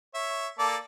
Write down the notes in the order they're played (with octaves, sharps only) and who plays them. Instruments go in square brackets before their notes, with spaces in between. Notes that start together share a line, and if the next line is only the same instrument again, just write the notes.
[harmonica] C#5 E5
A#3 A4 D5